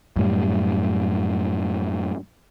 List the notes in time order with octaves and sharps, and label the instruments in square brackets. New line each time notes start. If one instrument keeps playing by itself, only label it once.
[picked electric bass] F#2 A2 G3